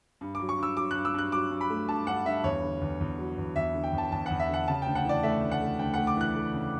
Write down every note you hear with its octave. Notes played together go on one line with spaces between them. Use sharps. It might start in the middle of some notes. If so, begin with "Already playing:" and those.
G2
F#3 D6
C#6
G2 E6
F#3 D6
G2 F#6
E6
G2 F#6
F#3 D6
G2
B5
A3
G2 A5
G2 F#5
G2 E5
E2 C#5
D3
E2
E2
F#3
E2
E2 E5
D3
G5
E2
A5
E2 A5
E2 F#5
E5
D3
F#5
C#3 A5
D2 G5
F#5
E3 D5
A3 E5
D2
F#5
A3
D2 G5
A3 F#5
D6
E3 F#6
A3
C#3